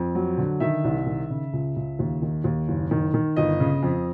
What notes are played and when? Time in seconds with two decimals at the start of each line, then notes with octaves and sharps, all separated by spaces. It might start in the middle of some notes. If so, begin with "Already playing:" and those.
Already playing: F2
0.15 F#3
0.38 D3
0.60 D#3 E5
0.84 C2
1.06 D#3
1.30 C#3
1.53 C#2
1.76 C#2
1.99 D#2
2.22 D#3
2.44 D#2
2.68 F#1
2.91 D#3
3.14 D#3
3.36 G1 D#5
3.60 C#3
3.83 F2